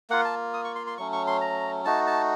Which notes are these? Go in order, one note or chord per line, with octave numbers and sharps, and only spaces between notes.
A#3 F4 F#5
A5
D#6
C#6
C6
C6
F#3 A3 C#4 C#6
C#6
C6
A#5
A3 D#4 F#4 A5
A5